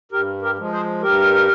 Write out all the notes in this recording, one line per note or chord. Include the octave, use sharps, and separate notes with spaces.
G2 G4 A#4
G4 A#4
F3 G#3
G#4 C5
G2 G4 A#4